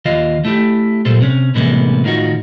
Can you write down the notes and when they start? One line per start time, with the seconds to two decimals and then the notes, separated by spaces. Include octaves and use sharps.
0.05 D#2 D#3 F4 D#5 F5
0.45 A3 E4 G4
1.05 F#2 A#2 G3 A4 C5
1.20 C3 C#4
1.55 A2 C3 E3 G#3 A#3 B3
2.04 A2 D#3 D#4 F4 F#4